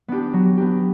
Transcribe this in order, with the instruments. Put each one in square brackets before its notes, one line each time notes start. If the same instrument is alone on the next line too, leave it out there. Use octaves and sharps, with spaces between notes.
[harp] B3 D4 G4
F#3
B3 D4 G4